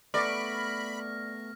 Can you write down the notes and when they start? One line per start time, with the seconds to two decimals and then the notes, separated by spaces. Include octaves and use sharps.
0.14 A3 B3 D5 B5 C#6 F6 A#6